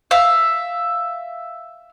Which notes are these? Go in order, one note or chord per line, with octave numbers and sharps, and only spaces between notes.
E5 F5